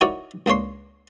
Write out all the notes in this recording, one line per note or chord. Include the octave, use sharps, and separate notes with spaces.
D#4 E4 F#4 A#4 C#5 D5
C#2 A#3 D4 C#5 C6